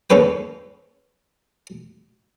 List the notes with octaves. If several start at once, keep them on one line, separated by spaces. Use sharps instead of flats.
D#2 G#2 C#4 A4 B4 G5